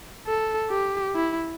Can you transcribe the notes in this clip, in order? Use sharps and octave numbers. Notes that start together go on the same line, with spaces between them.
A4
G4
E4